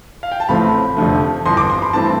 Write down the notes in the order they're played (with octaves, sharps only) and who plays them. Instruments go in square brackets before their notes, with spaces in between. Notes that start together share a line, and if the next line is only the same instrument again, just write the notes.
[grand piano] F5
G5
A5
A1 A2 F3 A3 C4 B5
F1 F2 D3 F3 A3
G1 F2 E3 C6
D6
C6
B5
G2 E3 A3 C4 A5